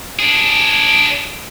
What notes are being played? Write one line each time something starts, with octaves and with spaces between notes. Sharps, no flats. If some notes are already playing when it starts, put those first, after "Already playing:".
D4 G#4